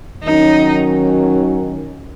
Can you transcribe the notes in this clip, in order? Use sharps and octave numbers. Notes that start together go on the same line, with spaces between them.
D#3 F#3 C#4 D#4